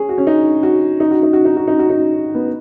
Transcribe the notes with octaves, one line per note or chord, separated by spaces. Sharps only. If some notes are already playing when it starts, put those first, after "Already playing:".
Already playing: C#4 G#4
F#4
C#4
D#4
F#4
D#4
F#4
D#4
F#4
D#4
F#4
D#4
F#4
D#4
B3